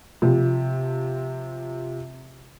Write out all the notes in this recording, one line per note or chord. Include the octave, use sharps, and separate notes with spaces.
C3 F3